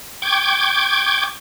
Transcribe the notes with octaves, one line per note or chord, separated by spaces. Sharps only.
G5 C#6 D6 G6 G#6